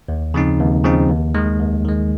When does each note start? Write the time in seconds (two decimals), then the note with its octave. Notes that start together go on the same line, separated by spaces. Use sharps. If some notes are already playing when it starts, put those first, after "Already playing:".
0.08 D#2
0.34 C#3 F3 C4 D#4
0.60 D#2
0.84 C#3 F3 C4 D#4
1.09 D#2
1.35 D#3 G#3
1.59 D#2
1.85 D#3 G#3